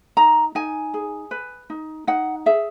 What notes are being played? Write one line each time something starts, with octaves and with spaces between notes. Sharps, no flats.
D#4 A#5
D#4 G#5
G#4
B4
D#4
D#4 F#5
G#4 E5